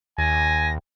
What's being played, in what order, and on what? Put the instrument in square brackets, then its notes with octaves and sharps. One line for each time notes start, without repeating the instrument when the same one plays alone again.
[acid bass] D#2 [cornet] G#5 [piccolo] A#6